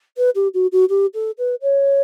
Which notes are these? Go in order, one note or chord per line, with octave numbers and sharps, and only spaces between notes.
B4
G4
F#4
F#4
G4
A4
B4
C#5